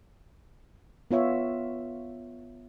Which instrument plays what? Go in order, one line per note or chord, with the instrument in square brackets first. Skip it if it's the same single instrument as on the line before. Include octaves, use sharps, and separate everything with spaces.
[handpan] B3 F4 C#5 E5